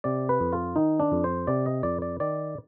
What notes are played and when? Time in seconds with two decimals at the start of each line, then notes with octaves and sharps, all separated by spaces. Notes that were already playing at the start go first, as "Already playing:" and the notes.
0.04 C3 D5
0.29 B4
0.40 F2
0.53 F4
0.76 D#3 D#4
1.00 D4
1.12 F2
1.24 C5
1.47 C3 D5
1.66 D#5
1.83 F2 D5
2.02 D5
2.20 D#3 D5